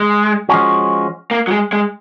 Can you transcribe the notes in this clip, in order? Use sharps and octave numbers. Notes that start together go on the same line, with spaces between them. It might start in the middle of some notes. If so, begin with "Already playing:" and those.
Already playing: G#3
F3 G#3 C#4 F#4
A#3
F#3
G#3
G#3